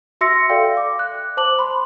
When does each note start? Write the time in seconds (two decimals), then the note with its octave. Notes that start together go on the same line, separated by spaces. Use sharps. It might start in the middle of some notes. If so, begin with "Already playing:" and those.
0.21 F#4 E5 C6 E6 A#6 C#7
0.49 A4 D5 F5 G5
0.77 D6
0.99 F#6
1.37 C5 A5 D6 F#7
1.59 B5 C6